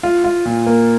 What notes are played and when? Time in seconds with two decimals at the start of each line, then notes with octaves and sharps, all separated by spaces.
0.03 F4
0.24 F4
0.45 A#2
0.66 A#3